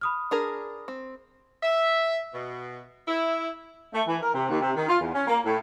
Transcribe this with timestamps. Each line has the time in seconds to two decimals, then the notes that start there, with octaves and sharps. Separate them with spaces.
0.01 B5 D#6 F6
0.31 D4 G#4 A#4
0.88 C4
1.63 E5
2.34 B2
3.08 E4
3.94 A3
4.08 E3
4.22 A#4
4.34 C3
4.50 D#2
4.62 C3
4.76 D#3
4.89 F4
5.00 E2
5.14 C#4
5.28 A#3
5.45 A2